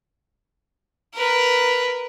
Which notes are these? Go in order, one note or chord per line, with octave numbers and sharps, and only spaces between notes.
A#4 B4